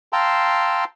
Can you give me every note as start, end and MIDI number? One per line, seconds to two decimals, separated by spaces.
0.13 0.84 77
0.13 0.84 79
0.13 0.84 81
0.13 0.84 82
0.13 0.84 84
0.13 0.84 88